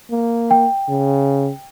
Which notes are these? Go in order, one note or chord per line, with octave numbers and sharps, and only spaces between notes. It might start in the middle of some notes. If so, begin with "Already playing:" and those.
A#3
G5
C#3